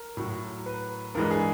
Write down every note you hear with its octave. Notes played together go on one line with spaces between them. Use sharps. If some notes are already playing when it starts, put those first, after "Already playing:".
Already playing: A#4
A2 F#3
B4
G2 E3 G#3 A#4
G#4